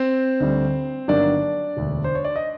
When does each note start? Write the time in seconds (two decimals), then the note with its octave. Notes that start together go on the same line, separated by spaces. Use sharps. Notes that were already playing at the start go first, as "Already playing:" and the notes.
Already playing: C4 C5
0.40 D2 D3 G3
1.08 G1 G2 D#3 F#3 A#3 D4 D5
1.77 E1 D2 D3
2.04 C5
2.15 C#5
2.24 D5
2.36 D#5